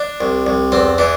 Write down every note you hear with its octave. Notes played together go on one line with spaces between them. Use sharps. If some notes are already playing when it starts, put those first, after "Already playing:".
Already playing: D4
C2
C2
E2 C4
E3 D4